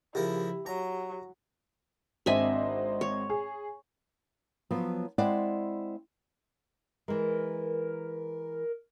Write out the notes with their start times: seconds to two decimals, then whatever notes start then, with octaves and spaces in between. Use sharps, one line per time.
0.15 C#3 F3 E4 G4 A#4
0.66 F#3 A#5
2.26 G#1 C4 D4 D#5 E5 G#5
3.01 C#5
3.30 G#4
4.71 F3 F#3 B3
5.18 G#3 C4 E4 D5 F#5
7.08 E3 G#3 A#4